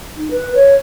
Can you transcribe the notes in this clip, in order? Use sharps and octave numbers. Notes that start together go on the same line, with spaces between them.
D#4
B4
C#5